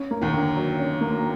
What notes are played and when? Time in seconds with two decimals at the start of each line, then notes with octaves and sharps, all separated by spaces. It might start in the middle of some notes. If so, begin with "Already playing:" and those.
Already playing: C#4
0.11 A#3
0.21 D#2 D#3
0.33 D3
0.56 F#3
0.79 C#4
1.01 A#3